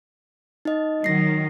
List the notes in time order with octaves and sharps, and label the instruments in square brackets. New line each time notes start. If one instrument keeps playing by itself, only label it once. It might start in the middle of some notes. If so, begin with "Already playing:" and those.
[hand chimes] D#4 D#5
[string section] D#3 F#3 [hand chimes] A#6 C7